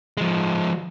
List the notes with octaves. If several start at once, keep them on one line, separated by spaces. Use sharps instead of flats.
F3 G#3